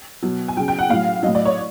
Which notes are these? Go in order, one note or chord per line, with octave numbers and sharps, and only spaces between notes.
B2 F#3
G#5
C#3 F#3 G5
G5
F#5
A2 F#3 F5
A2 F#3 D#5
D5
C#5